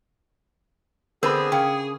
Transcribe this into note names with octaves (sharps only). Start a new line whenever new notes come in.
D3 B3 C4 G#4 A#4 B5
C#3 G5